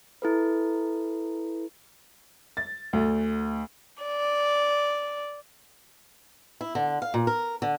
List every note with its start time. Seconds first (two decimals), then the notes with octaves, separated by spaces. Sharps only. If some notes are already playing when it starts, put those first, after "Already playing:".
0.22 E4 A4 B4
2.57 A6
2.93 D2
4.03 D5
6.61 E4
6.75 D3
7.02 F5
7.14 A#2
7.27 A#4
7.62 D3